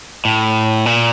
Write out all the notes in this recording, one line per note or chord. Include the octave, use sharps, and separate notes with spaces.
A2
A#2